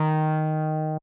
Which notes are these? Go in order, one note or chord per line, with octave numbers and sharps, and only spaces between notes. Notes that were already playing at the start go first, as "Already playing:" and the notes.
Already playing: D#3